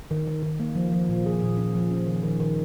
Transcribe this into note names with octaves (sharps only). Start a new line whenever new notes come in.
D#3
D#3
D#3
A#3
F3
F3
A#2
G#4
A#2
C#4
F3
C#4
D#3
D#3
D#3